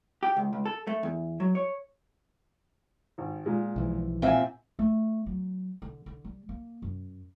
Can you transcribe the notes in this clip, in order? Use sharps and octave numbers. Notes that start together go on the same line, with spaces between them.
G4
C#2
C#2
A4
A3
E2
F#3
C#5
G#1
A#2 G#3
B1 E3 F3
A#2 C4 E5 F#5 G#5
A3
F#3
D3
D3
G3
A#3
F#2